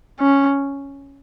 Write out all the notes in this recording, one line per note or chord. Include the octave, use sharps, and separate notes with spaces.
C#4